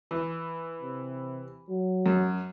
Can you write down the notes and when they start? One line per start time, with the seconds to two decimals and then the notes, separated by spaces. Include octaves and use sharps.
0.11 E3
0.82 C3
1.69 F#3
2.06 F#2